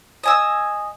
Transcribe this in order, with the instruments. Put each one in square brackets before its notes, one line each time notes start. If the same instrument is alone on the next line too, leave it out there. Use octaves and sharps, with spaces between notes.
[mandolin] D#5 G#5 E6